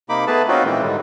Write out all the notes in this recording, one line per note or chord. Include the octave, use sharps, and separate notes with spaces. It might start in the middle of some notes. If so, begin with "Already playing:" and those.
C3 A#3 D#4 B5 D6
A3 B3 G#4 B4 A5
C4 C#4 D#4 F4 F#4
A#2 D#3 E3 G#3 A#3 C4
G#2 D3 D#3 G3